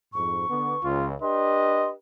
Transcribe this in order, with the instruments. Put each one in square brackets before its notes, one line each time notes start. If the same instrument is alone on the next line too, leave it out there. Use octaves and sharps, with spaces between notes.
[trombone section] F2 G#2 [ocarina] C#6
[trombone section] D3 B3
[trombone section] C#2 [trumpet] F4
[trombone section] D4 G4 B4 [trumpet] D#5 [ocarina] C6